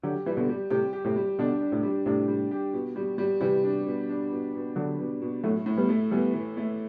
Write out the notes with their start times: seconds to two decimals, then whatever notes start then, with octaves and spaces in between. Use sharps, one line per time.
0.03 D3 F#3 G4
0.26 E3 G3
0.37 B2 D3
0.49 G3
0.70 A2 C3 G4
0.93 G4
1.05 A2 C3
1.16 G3
1.39 B2 D3 D4
1.61 D4
1.72 A2 C3
1.83 G3
2.06 A2 C3 D4
2.28 G3
2.51 G4
2.73 B2
2.96 G3
3.18 G3
3.41 C3 E3 G3
3.63 D4
3.87 B2
4.09 D4
4.32 B2
4.54 B2
4.76 D3 F#3 D4
4.99 B2
5.22 B2
5.44 A2 F#3 A3
5.66 A2
5.77 G3 B3
5.89 A3
6.11 E3 G3 B3
6.34 E3
6.57 A3